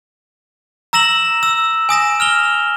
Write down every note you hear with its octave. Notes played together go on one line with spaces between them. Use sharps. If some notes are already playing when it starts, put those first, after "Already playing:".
A#5 E6 A#6 E7 F#7
E6
G#5 D#6 A#6 E7
F6 F7 G7